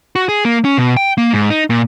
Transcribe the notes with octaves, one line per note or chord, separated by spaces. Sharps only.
F#4
G#4
A#3
C#4
B2
G5
A#3
G#2
D#4
A#2